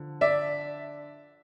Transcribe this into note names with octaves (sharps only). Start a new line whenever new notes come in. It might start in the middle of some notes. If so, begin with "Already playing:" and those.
Already playing: D3 F3
D5 E5